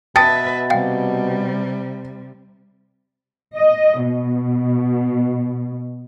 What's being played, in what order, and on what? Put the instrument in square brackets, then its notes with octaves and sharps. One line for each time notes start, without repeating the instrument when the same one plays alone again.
[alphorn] B2 [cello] B4 E5 [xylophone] G5 A5 D#6 [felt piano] A6
[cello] C3 G3 [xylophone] F5 G5
[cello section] D#5
B2